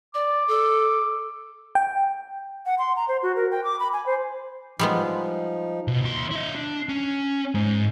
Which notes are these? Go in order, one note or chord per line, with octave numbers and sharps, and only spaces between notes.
D5 D6
A4
G5
F#5
C6
A#5
C5
F#4
A#4
G5
D6
B5
G#5
C5
F3 G3 G#3 B3 D#4
B2
D#2 C6
E4 D#5
D4
C#4
G#2